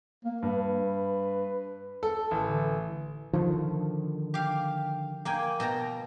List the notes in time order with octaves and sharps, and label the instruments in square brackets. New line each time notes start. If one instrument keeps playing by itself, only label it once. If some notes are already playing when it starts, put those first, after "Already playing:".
[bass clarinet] A#3
[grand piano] G2 [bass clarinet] B4
[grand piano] A4
A1
[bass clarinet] D3
[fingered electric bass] D3 D#3 [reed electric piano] F3
[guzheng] G4 F5
A#3 G5 G#5
B2 G5 A#5